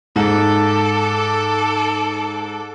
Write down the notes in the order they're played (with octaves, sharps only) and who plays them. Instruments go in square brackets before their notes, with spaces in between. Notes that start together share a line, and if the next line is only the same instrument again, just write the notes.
[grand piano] G#2 [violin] A4 D6